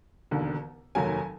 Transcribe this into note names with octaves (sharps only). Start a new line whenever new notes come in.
E1 D#2 D3
F1 D#2 D#3 F#3 G#5